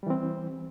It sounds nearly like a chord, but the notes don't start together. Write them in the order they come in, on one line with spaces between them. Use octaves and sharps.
G3 E3 C4